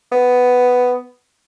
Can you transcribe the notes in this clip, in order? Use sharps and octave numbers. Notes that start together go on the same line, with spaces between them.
B3